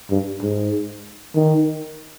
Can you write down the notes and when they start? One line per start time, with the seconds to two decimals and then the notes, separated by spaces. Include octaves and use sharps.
0.10 G2
0.41 G#2
1.35 D#3